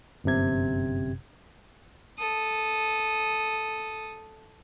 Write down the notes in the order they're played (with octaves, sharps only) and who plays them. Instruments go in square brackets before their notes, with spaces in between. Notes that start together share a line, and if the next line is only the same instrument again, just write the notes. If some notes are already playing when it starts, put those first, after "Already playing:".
[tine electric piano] G1 F#2 C3 G#6
[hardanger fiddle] A4 D#6